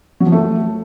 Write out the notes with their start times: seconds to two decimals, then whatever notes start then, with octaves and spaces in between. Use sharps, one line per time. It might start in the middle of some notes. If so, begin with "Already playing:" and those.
0.20 F#3
0.26 F3
0.32 A3